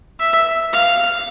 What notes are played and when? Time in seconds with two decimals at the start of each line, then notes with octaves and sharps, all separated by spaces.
0.19 E5
0.73 F5